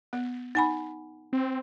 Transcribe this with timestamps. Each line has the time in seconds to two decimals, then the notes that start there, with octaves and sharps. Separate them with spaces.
0.13 B3
0.55 D#4 F#5 G#5 B5
1.33 C4